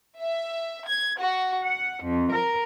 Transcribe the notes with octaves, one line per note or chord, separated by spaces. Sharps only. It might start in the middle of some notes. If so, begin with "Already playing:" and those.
E5
G#6
F#4
F#5
F2
A#4